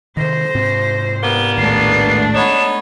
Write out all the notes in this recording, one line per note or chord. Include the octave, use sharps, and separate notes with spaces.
C3 D#3 C5 A#6
G#2 C3 C4
G3 A#3 B3 G7
A#1 D#2 A2 G#3 A3 D4 C7
B3 D#4 C#5 E7